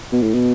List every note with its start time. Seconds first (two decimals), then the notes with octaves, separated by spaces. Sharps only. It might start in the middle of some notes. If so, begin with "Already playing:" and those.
0.12 B2
0.23 A2
0.34 B2